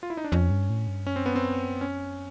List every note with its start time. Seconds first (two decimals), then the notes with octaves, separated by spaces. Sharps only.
0.03 F4
0.10 E4
0.17 D#4
0.24 D4
0.32 F2 C#4
0.50 G2
0.70 A2
0.88 G2
1.06 F#2 C#4
1.16 C4
1.26 B3
1.36 C4
1.81 C#4